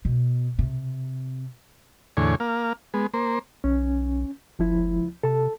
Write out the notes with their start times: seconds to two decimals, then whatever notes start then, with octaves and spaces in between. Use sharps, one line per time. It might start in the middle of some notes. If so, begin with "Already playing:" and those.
0.05 B2
0.59 C3
2.17 E2 A2 D3 C#5 G#5
2.40 A#3 F5
2.94 G#3 B3
3.14 A#3 C5
3.64 B1 C#4
4.59 F#1 C#2 F3 E4
5.23 C3 A4 A5